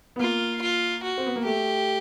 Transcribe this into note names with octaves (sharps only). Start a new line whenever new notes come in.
B3
A#3 F4
F4
F#4
C4
B3
A#3
A3 G4